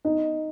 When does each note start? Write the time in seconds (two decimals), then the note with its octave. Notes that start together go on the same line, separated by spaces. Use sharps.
0.05 D#4